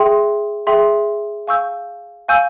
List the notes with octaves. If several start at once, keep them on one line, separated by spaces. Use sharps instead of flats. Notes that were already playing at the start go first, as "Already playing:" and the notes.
Already playing: G#4 E5 G5 C6
G#4 E5 G5 C6
F5 G#5 C#6 E6 G6
F5 G#5 C#6 E6 G6